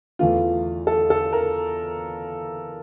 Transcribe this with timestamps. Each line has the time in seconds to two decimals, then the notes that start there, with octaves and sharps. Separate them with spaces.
0.19 E2 E3 A3 F4
0.87 A4
1.10 A4
1.33 A#4